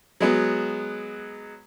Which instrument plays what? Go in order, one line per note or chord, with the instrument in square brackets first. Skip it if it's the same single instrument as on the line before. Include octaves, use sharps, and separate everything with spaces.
[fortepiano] F#3 G#3 B3